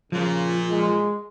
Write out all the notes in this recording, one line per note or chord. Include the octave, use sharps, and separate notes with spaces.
A#2 C#3 F3
G#3